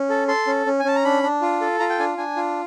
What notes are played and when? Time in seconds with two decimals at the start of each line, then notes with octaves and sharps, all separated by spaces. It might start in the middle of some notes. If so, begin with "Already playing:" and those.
Already playing: C#4
0.10 A4
0.28 A4 C6
0.47 C#4
0.66 C#4
0.80 G#5
0.85 C#4 A5
0.96 A#5
1.05 D4 B5
1.23 D4
1.42 F4
1.61 A4
1.79 F4 A#5
1.90 G5
1.99 D4 G#5
2.18 D4 G#5
2.37 F4